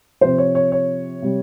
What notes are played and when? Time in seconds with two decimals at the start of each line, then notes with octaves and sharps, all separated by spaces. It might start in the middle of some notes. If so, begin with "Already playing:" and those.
0.21 C3 F3 C5
0.38 C#5
0.55 C#5
0.72 C#5
1.22 C3 G3